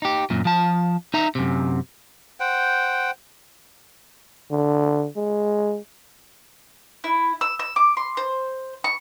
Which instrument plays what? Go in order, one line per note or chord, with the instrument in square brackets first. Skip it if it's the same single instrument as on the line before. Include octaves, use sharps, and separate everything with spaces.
[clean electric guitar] D#4 G4
F#2 A#2
F3 A5
D#4 E5 A#5
F#2 C3
[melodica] C5 F#5 G5
[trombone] D3
G#3
[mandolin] E4
E6
E6
D6
C6
C5
C#6